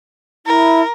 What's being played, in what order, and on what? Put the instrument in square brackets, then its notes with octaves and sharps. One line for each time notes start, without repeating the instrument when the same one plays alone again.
[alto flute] E4 [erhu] A#4